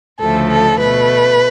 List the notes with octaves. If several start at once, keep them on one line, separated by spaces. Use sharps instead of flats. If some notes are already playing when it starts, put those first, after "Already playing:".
D2 C#3 F3 A3 A4
A4
B2 A3 B4